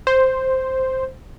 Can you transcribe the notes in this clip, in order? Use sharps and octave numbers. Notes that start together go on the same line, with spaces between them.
C5